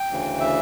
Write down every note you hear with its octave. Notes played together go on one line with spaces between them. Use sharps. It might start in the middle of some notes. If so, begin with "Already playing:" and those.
Already playing: G5
D2 C#3 E3
E5